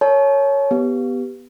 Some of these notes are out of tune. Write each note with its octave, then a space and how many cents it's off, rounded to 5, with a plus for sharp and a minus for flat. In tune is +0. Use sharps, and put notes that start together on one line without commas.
A#4 -30 C#5 +0 A5 -45
B3 +0 G4 +0